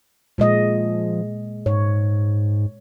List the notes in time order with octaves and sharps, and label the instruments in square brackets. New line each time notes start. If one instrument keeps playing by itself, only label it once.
[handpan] A#2 G#3 D#5 [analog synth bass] F3
[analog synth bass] G#2 [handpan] C#5